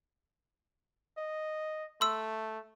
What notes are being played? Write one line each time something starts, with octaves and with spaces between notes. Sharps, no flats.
D#5
A3 C6 E6